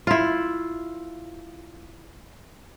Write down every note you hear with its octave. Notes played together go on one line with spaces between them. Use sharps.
E4 F4